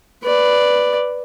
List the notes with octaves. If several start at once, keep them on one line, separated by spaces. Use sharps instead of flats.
B4 D5